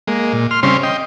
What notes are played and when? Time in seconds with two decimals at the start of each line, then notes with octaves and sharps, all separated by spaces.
0.08 G#3 A#3
0.33 A#2
0.51 C6 F6
0.63 C#3 G3 C4 C#4 C6
0.83 D#5 G5